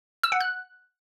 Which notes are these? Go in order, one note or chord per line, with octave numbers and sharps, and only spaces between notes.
E6
F#5
F#6